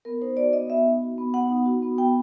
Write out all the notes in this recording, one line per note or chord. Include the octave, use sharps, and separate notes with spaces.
B3 A#4
D#4 C5
F#4 D5
B3 D#5
B3 E5
D#4
F#4
B3
B3 F#5
D#4
F#4
B3
B3 G5